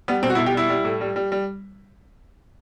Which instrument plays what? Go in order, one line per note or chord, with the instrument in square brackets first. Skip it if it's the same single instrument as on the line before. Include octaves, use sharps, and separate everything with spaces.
[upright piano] G3 B3
B2 C4
F#4
E4
B2
G4
G3 E4
G3
A2
G3
G3
G3